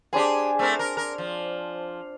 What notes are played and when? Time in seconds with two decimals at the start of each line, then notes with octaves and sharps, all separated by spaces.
0.13 D4 G4 G#4 C5 G#5
0.59 A3 C4 A#4
0.79 A#4
0.97 A#4
1.18 F3